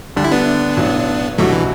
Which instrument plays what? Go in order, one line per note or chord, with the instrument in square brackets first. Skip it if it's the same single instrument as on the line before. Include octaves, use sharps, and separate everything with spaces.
[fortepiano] D2 D3 G3 [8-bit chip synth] D4
[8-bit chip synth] E4
B3 D4
[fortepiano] B1 A2 F#3
[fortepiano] C2 B2 G3 D4 F#4 [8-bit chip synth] F#3 A3
[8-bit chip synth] E3